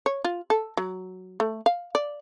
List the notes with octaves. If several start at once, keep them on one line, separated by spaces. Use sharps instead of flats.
C#5
F4
A4
F#3
A3
F5
D5